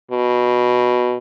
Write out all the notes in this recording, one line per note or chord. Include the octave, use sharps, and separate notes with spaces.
B2